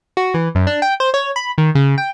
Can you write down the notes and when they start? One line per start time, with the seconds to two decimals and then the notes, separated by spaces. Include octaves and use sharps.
0.17 F#4
0.34 E3
0.55 F#2
0.67 D4
0.82 G5
1.00 C5
1.14 C#5
1.36 B5
1.58 D#3
1.75 C#3
1.98 G5